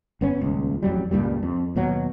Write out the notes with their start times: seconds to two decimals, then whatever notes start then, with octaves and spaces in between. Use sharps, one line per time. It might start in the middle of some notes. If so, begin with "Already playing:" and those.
0.21 G1 B3 C#4
0.41 D#1 C#2
0.83 A1 F2 F#3 G3
1.11 C#2 G2 A#2 G3
1.43 F2
1.76 D#2 B2 F#3